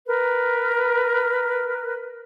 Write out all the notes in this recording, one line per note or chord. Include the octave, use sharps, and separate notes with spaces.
A#4 B4